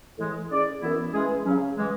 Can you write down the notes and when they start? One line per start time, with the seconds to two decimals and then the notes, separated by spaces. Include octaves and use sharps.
0.18 A2 E3 G#3
0.50 A2 G#3 C#4 G#4 D5
0.81 F#2 E3 B3 E4
1.12 E3 G#3 C#4 G#4
1.44 C#3 F#3 C#4
1.77 E3 G#3